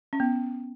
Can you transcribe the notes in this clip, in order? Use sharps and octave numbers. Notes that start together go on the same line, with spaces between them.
C#4
B3